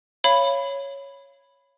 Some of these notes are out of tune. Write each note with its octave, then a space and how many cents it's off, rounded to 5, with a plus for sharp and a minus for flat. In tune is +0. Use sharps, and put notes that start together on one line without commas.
C#5 +0 F5 -30 B5 +0